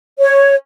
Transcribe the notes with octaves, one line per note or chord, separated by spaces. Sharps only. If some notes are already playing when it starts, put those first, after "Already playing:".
C#5